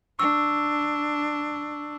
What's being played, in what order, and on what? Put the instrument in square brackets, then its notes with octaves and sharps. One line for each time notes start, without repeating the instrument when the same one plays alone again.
[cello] D4 [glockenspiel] C#6 E6